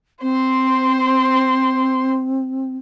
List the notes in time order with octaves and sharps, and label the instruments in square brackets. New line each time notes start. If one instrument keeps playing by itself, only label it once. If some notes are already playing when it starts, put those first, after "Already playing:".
[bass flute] C4 [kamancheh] C5 C6